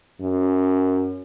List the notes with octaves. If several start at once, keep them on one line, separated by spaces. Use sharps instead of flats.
F#2